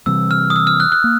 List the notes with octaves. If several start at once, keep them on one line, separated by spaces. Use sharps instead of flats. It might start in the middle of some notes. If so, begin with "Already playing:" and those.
C3 E3 G3 C4 E6
F6
D#6
E6
F6
F#6
F#6
A#3